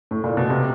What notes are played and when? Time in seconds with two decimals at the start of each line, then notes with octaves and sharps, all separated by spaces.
0.11 A2
0.24 A#2
0.37 B2
0.50 C3